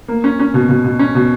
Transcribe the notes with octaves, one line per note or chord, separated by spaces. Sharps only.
A#3
C#4
C#4
B2
B2
B2
C#4
B2